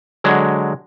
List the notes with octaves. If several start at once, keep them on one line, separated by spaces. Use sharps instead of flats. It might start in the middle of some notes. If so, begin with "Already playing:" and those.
D3 F#3 G#3